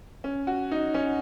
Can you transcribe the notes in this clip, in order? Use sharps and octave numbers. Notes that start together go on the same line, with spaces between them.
C#4
F#4
D#4
C#4